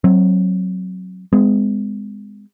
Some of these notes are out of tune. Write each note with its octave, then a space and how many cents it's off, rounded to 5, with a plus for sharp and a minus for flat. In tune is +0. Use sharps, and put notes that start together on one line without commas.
F#3 +0 C4 +20
G#3 -15 B3 +45